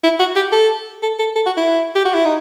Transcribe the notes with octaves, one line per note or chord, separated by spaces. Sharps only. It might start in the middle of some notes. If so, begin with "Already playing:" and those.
E4
F#4
G4
A4
A4
A4
A4
F#4
E4
G4
F#4
E4
D#4